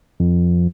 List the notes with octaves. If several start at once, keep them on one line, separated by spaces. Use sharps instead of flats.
F2